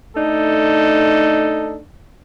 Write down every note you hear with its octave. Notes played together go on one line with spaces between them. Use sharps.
A3 D4 D#4 A4